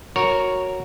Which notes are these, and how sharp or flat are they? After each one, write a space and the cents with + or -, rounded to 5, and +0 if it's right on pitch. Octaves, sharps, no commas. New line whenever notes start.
F#4 -5 A#4 +0 C#5 +0